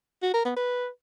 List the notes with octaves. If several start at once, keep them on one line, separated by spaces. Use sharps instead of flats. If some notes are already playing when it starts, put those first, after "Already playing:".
F#4
A#4
B3
B4